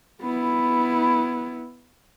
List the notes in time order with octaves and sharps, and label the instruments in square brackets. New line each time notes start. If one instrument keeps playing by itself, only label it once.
[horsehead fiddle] B3 E4